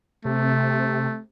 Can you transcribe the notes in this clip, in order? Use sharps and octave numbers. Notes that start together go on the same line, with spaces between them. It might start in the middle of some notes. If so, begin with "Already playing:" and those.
C3 A3